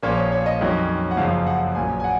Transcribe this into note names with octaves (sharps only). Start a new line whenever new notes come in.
A#1 A#2 F3 A#3 C#4 C#5
C#5
C#5
D#5
F2 D#3 F#3 C#4
F#5
F#1 F#2 C#3 F3 F5
F#5
A#1 A#2 F#3 G#5
G#5
F#5